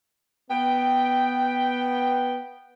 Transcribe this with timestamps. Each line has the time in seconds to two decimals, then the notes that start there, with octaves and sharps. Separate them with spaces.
0.51 B3 G5